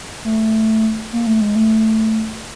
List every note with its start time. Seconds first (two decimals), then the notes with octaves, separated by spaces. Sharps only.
0.24 A3
1.13 A#3
1.27 A3
1.41 G#3
1.55 A3